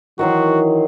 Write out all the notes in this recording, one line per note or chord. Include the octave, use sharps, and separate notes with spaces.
D#3 E3 F#3 F#4 C5